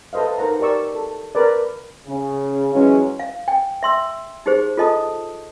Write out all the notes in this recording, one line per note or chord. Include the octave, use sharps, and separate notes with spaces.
A4 B4 C5 D#5 F5
D#4 A#4 C5 F#5 A#5
G4 A#4 D5 C#6 E6
A4
A#4 B4 D5
C#3
E3 F#3 G#3 C#4
F5
G5
E5 C6 E6
D#4 G4 G#4 C5
F4 A4 D#5 A5 D#6